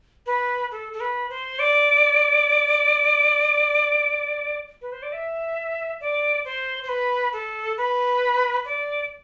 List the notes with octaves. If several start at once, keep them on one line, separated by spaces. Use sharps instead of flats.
B4
A4
A4
B4
C5
D5
B4
C5
D5
E5
D5
C5
C5
B4
A4
B4
D5